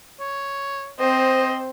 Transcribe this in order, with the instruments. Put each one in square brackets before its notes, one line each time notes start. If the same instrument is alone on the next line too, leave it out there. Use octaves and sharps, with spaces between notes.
[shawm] C#5
[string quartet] C4 C5 [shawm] D#5